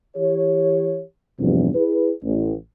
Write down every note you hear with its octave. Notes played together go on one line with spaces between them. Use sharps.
E3 G4 C#5
A1 E2 G2 C3 F3
E4 G#4 B4
A1